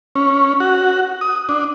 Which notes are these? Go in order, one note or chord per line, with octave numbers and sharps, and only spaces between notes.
C#4
F#4
D#6
D4